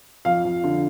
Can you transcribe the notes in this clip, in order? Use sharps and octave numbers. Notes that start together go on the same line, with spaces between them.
F2 F5
F2
D3